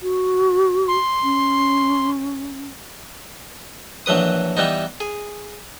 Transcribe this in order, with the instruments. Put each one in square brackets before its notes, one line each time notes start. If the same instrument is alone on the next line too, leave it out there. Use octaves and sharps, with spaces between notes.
[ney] F#4
[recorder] C6
[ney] C#4
[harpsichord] A#1 E3 F#3 B4 D#6
E3 G3 B3 D#4
G#4